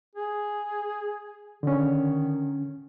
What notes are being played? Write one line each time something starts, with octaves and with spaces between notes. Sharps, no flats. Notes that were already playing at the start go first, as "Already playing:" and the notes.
G#4
D3 D#3 C#4